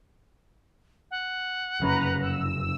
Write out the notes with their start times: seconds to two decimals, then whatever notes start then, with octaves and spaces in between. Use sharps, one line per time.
1.11 F#5
1.80 F1 F#2 C#3 B4 A#5
2.21 E6